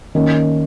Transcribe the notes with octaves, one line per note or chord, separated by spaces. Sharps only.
D#3 A#3 C#4